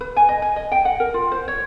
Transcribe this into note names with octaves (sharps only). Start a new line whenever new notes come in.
B4
G#5
D#5
G#5
D#5
G5
F#5
A#4
F4
C5
C#5